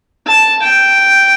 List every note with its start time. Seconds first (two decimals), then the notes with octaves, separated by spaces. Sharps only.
0.27 A5
0.62 G5